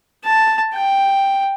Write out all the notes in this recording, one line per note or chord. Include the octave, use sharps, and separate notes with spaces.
A5
G5